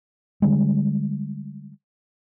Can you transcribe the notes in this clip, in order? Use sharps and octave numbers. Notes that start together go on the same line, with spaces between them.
D3 G3 G#3